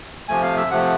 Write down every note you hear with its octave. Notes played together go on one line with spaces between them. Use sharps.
C3 F3 A3 G#5
F5
E5
C3 F3 A3 F#5